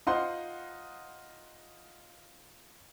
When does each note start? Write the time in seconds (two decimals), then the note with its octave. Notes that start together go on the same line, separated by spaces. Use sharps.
0.07 D#4 F4 C5 F#5 C6